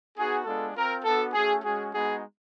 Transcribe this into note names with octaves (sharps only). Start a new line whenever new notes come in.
B3 D#4 F#4 G#4
G#3 B3 D4 F4 A4
C4 F4 A#4
B3 D4 F#4 A4
A3 C#4 F#4 G#4
G#3 C#4 F#4 G#4
G#3 B3 D#4 F#4 G#4